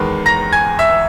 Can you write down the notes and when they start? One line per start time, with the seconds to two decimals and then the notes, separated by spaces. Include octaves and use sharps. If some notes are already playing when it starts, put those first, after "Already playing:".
Already playing: E2 D#3 G#3 B4
0.26 A#5 A#6
0.52 G#5 G#6
0.79 E5 E6